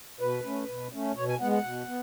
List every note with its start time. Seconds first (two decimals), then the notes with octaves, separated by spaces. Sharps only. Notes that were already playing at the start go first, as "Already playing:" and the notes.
0.21 B2 B4
0.45 A3 C#4
0.68 B2
0.93 A3 C#4
1.16 B2 C#5
1.28 G#5
1.40 B3 F#5
1.43 G#3
1.52 F#5
1.64 B2
1.87 B3